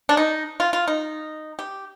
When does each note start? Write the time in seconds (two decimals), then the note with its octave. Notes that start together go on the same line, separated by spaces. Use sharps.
0.09 D4
0.17 D#4
0.60 F4
0.73 F4
0.88 D#4
1.59 G4